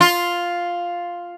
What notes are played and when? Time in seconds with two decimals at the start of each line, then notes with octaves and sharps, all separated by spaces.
0.01 F4